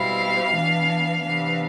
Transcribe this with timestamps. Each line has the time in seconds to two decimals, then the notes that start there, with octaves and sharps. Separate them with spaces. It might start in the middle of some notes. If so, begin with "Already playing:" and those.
Already playing: B2 G3 C4 E4 F5
0.54 E3 B3 D4
1.23 C3 E3 B3 D4 F5